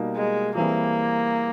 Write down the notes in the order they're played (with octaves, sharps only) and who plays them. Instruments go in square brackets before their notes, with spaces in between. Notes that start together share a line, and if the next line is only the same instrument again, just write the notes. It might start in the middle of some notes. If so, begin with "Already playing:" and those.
Already playing: [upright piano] B2 G3 A#3 D#4
[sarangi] G#3
[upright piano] E3 G3 C4 E4 G#4 [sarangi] A#3